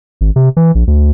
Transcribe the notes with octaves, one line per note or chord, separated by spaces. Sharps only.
G#1
C3
E3
A#1
D2